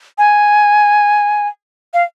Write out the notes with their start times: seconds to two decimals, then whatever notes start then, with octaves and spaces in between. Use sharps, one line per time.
0.18 G#5
1.94 F5